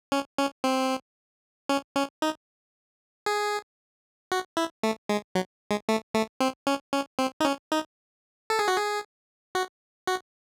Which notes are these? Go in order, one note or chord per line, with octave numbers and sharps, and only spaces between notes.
C#4
C#4
C4
C#4
C#4
D#4
G#4
F#4
E4
A3
G#3
F#3
G#3
A3
A3
C4
C#4
C#4
C4
D#4
C#4
D#4
A4
G#4
F#4
G#4
F#4
F#4